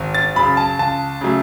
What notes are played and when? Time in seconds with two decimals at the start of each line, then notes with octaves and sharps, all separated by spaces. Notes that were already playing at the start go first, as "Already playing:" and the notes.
Already playing: G#1
0.15 A6
0.36 F#2 C#3 B5
0.57 A5
0.79 C#2 A5
1.21 C#3 F#3 A3